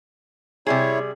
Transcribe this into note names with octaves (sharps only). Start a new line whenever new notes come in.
C3 G3 E4 G#4 C#5